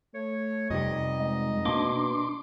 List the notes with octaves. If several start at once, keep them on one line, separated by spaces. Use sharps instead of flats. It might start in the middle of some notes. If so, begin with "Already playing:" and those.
A3 C#5
F2 C3 G3 B3 C4 D#4 D#5
G#3
B2 A#3 D4 C6 D6